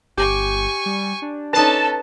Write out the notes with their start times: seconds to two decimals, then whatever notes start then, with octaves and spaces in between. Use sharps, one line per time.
0.17 G1 G4 G#5 C#6
0.86 G3
1.22 D4
1.53 C#4 D#4 A4 B4 A5